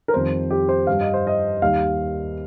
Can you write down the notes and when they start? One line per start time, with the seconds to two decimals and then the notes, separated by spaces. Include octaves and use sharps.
0.08 A#4
0.13 F2 D#3 G3 C5
0.50 G4
0.69 C5
0.87 G2 G3 F5
1.01 D#5
1.14 C5
1.27 D#5
1.62 D#2 D#3 G3 F5